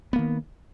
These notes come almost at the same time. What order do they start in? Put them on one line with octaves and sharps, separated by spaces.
B3 A#3 D#3